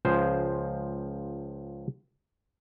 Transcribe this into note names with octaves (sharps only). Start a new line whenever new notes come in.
C#2 F3 G#4 C5 G#5